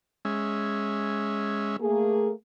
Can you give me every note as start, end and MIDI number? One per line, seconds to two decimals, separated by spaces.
0.25 1.77 56
0.25 1.77 61
0.25 1.77 76
1.80 2.31 57
1.80 2.31 58
1.80 2.31 68